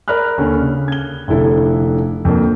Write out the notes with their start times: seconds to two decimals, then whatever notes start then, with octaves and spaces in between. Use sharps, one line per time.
0.08 A#4 D5 B5 F6 F#6
0.38 D#2 D3 C#4
0.60 C#3
0.88 G#6 G7
1.28 F1 D3 E4 A4
2.25 F2 D3 A#3